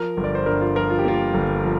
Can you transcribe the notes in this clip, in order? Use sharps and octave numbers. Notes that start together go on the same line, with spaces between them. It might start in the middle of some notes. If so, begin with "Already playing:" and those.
Already playing: F3 A#4
G1
D5
C5
G2 A#4
F4
F3 A#4
F4
G4
A#3 F4
G1
F3